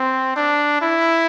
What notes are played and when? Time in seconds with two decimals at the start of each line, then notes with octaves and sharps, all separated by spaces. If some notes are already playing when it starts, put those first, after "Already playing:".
Already playing: C4
0.36 D4
0.81 E4